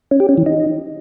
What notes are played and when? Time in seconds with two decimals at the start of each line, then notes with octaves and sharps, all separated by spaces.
0.11 C#4
0.20 G4
0.29 C#4
0.38 E3
0.46 D#4